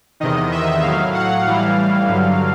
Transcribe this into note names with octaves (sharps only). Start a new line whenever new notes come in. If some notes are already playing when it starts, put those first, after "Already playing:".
E2 C3 D#3 D#5
E5
A2 F5
F#3
F#5
A2 E3 G3 F5
G2 D3 F#3